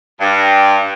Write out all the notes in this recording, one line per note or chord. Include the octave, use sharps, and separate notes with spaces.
G2